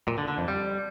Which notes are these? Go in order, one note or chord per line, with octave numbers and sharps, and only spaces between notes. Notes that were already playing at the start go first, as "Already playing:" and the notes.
A#2
D3
D3
F2
G3